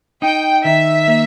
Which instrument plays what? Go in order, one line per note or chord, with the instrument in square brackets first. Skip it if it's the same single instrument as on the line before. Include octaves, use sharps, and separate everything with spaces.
[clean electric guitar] D#4 [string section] G5
[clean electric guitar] D#3 [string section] E5
[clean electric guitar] A#3